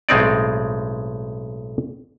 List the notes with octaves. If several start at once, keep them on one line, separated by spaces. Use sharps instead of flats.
B1 A2 G#3 C4 D#4 D5